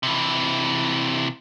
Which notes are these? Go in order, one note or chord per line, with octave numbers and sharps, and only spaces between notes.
C3 E3